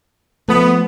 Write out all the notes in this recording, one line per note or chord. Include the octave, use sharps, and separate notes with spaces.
F3 A3 B3